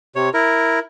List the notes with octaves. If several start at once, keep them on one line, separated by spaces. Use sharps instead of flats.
C3 C#5
E4 A#4